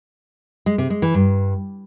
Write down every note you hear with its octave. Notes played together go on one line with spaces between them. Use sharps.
G#3
C3
G#3
E3
G2